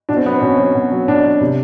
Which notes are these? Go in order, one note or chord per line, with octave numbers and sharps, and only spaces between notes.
B2 D4
C4
F#3 B3
C4
B2 C#4
F#3
B2
F#3
B2 D4
F#3
C3